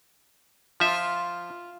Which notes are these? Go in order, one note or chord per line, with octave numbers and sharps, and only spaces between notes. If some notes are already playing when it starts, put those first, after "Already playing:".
F3 F4 E5